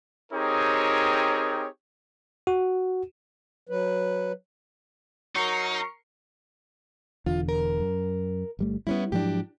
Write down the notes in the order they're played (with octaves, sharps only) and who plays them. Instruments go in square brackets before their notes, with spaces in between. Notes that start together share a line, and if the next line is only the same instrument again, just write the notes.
[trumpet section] C4 D#4 G4 G#4 A#4 C#5
[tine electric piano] F#4
[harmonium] F#3 B4
[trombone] F#3 [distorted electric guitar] D#4 [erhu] A#4 [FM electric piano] C#6 C7 C#7
[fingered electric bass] E1 E2 D3 [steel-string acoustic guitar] F4
[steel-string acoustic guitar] A#4
[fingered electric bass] F#2
G1 G3 A3
[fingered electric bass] G3 [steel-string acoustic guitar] B3 C#4 E4
[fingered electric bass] G#2 F3 F#3 [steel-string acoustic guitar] D4 G4